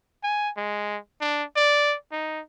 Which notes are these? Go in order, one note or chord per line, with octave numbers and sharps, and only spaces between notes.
G#5
G#3
D4
D5
D#4